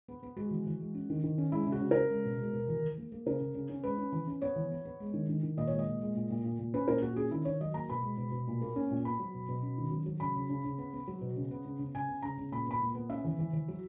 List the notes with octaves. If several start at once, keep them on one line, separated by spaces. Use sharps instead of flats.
B3
B3
G#3 F#4
E3
E3
G#3
C#4
D#3
D#3
C#4
G#3 E4
C#3
F#4
C#3
C#3 A#4
G#3
B2
G#3
B2
E3
E3
A#3
A#3
C#3 A#4
C#3
C#3
C#4
G#3 B4
C#4
E3
C#4
B3 C#5
E3
B3
B3
G#3
D#3
D#3
D#3
A#2 D#5
G#3 C#5
D#5
A#2
G#3
A#2
A#2
A#2
A#2
C#4 B4
A#2 A#4
A#2 F#4
C#4 G#4
D#3 E4
D#3 C#5
F#3 D#5
A#3 A#5
B2 B5
G#3
B2
B2
A#2
A#3
C#4
A#2
B3 B5
F#3
B2
B2
C#4
D#3
F#3
F#3
C#3 B5
C#3
C#3
C#3
B3
B3
F#3
B2
C#3
B3
C#3
C#3
C#3 G#5
B3
C#3 A#5
C#3
A#2 B5
B3 B5
A#2
B3
C#4 E5
E3
E3
E3
F#3